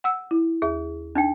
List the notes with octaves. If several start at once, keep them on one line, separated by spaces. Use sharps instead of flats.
F#5 E6
E4
D#2 G#4
D4 D#4 G5